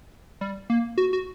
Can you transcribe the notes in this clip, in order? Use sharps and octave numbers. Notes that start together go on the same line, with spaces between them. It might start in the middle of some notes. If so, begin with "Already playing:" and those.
G3
A#3
F#4
F#4